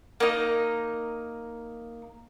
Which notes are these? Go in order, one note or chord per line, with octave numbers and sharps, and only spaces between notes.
A#3 D#4